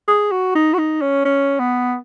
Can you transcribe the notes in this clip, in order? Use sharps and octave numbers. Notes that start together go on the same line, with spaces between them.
G#4
F#4
D#4
F#4
D#4
C#4
C#4
B3